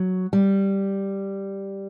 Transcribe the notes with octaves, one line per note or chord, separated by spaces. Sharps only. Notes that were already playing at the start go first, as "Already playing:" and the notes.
Already playing: F#3
G3